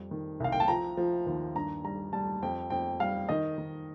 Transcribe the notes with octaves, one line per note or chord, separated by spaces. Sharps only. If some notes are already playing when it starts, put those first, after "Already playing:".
Already playing: F2 G3
D#3
C2 F5
G5
A5
F3 A#5
F3
D#2
G2 A#5
G3 A#5
G3 A5
F2 G5
F2 G5
G3 F5
D#3 D#5
D#3